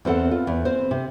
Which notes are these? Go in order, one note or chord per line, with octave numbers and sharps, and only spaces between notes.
E2 C4 A4 F#5
F4
E2
C4 C5
C3